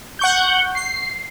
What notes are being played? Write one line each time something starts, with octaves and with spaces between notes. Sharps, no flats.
F#5 C#6 G6
C7